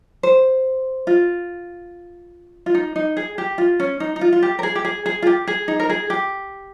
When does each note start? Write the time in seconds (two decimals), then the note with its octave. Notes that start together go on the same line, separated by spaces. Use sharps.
0.23 C5
1.07 F4
2.66 F4
2.75 D#4
2.96 D#4
3.17 G#4
3.38 G4
3.58 F4
3.80 C#4
4.00 D#4
4.16 D#4
4.21 F4
4.33 F4
4.43 G4
4.59 A#4
4.63 G#4
4.75 G4
4.85 G#4
5.06 G#4
5.22 F4
5.27 G4
5.47 G#4
5.68 D#4
5.80 A#4
5.90 G#4
6.10 G4